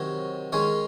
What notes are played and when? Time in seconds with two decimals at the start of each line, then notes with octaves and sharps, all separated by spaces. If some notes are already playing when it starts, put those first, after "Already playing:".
Already playing: C3 D#3 F#3 C#5
0.52 D#3 G#3 C#4 C#5